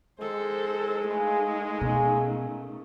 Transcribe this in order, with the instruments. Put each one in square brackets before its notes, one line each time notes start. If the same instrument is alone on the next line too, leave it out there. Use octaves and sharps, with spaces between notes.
[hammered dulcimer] D#3 [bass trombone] G#3 [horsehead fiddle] A4 C5
[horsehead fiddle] A3 D#4 [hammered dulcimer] G#4 B4 F5
[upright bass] B2 [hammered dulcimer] A#3 C#4 G#4